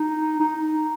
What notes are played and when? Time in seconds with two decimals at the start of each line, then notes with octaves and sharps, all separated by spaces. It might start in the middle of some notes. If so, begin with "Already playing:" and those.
Already playing: D#4
0.40 D#4